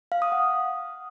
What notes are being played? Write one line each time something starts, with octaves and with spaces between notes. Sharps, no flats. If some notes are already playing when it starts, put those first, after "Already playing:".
F5
D#6
F#5